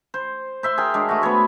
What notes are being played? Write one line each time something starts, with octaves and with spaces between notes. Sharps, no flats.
C5
C5 E5 C6
G#4 A#4 G5
G#3 D4
A3 F#4
B3 B4 C#5 E5